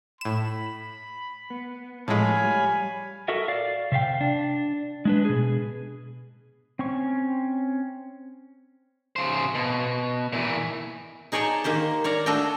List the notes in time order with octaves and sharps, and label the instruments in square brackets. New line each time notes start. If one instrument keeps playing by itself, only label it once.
[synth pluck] A2 E7 [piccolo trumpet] B5
[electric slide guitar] B3
[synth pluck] A2 G#3 [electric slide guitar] F3 A3 [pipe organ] C#5 F5 B5 [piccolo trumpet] G#5
[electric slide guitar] G3
F#4 A4 A#4 D#5 E5
D5 F5
C3 E5 F5 G5
D4
G#3 D4 B4
B2 G#4
[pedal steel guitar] C4 C#4 C#6
[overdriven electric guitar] C#3 C5
B2
A#2 E3
[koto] D#4 G#4 C#5 D5 G5 A5
D#3 A#3 G4 C5
C#5 D5 F5 A#5
A3 D4 F#4 A4 D#5 G5